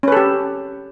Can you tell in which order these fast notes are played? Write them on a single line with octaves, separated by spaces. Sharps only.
C#4 B4 A4 G4